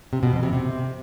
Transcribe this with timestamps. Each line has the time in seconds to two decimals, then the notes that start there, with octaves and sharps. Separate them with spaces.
0.13 C3
0.23 B2
0.33 F2
0.43 C3
0.53 C3